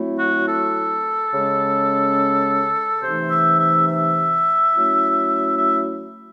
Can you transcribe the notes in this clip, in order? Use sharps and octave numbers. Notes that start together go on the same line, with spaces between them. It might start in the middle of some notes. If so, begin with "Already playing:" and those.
Already playing: F#3 A3 C4 E4
F#4
A4
C#3 G#3 C#4
C3 E3 A3 D#4 C5
E5
E5
E5
F#3 A3 C#4 E4
E5